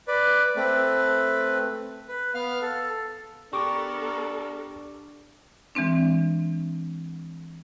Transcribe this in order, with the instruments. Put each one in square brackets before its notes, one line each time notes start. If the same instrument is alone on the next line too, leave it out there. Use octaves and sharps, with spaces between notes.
[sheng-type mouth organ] B4 D5
A3 C4 B4
B4
B3 F5 F6
A4
[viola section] B3 A4 A#4 [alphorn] D4 [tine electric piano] G4 D6 [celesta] C#6
[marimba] E3 G#3 C4 D4